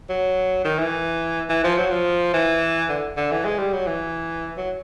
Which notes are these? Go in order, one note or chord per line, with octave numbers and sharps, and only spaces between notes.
F#3
D#3
E3
E3
F3
F#3
F3
E3
D3
D3
E3
G#3
G3
F#3
E3
F#3